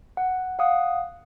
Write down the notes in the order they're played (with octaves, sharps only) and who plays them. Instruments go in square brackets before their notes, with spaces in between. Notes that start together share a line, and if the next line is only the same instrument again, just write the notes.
[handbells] F#5
F5 F#5 D#6